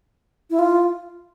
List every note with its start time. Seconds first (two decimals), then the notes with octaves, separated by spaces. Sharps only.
0.50 E4
0.59 F4